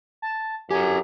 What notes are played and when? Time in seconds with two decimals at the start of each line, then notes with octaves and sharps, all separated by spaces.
0.22 A5
0.71 F#2 G4 A4 G#5